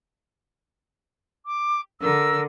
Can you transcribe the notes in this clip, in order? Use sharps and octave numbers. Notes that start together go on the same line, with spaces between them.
D6
D3 A#4 E6